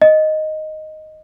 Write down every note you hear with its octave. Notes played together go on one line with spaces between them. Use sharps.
D#5